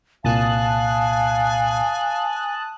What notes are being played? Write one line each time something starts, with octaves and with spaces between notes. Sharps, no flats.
C2 A#2 F5 G#5 A5 D#6 F#6